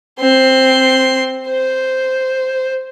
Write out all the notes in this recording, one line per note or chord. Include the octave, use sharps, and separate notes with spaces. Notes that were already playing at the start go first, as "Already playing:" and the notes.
C4 C6
C5